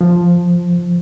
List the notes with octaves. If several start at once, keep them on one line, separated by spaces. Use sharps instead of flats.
F3